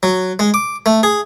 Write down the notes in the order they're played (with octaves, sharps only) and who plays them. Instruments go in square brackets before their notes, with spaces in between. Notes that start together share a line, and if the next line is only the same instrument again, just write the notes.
[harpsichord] F#3
G#3
D6
A3
G#4